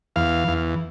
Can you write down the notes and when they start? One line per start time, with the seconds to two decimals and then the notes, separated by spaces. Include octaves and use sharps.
0.16 E2 F5
0.48 E2